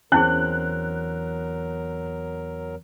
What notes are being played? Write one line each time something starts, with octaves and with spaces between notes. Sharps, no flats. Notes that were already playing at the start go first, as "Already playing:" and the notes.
E2 F#3 C4 C#4 E4 G#4 A#4 F#6